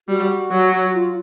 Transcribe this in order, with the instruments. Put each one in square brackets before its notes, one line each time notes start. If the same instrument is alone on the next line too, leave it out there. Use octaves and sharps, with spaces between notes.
[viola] G3 [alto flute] F#4
[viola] F#3
[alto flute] F4